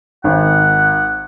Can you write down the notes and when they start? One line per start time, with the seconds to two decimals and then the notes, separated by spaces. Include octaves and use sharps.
0.24 G#1 F#5